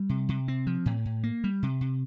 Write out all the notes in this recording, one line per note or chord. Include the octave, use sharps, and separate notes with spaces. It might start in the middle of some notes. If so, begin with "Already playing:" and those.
Already playing: G3
C3
C3
C4
F3
A2
A2
A#3
G3
C3
C3